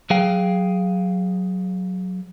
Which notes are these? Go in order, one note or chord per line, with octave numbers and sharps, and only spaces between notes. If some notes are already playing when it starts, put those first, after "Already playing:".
F#3 G#4 F5 G5